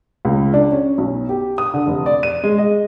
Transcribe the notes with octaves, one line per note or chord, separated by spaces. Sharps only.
C#2
D4
C#4
B1
G4
D#6
D3
F1
D5
D#7
G#3
D#5